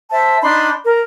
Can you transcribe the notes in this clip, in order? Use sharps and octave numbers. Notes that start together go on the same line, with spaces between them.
C5 E5 A5
D4 D#4 B5 C6
A#4